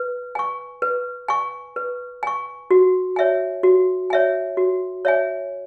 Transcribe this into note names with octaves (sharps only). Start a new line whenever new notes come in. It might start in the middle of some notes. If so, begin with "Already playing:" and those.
Already playing: B4
G#5 C#6
B4
G#5 C#6
B4
G#5 C#6
F#4
C#5 E5 G#5
F#4
C#5 E5 G#5
F#4
C#5 E5 G#5